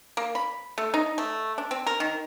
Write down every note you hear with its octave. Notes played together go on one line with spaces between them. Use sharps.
A#3
B5
A3
D#4
A3
D4
C4
A#4
D#3